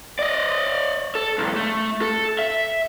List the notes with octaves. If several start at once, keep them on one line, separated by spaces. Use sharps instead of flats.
D5 D#5
A4
B1 E2
A3
A4
E5